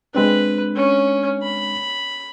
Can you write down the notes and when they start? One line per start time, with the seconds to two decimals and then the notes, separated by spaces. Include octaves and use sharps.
0.15 G#3 C4 D4 B4
0.76 C#4
1.43 B5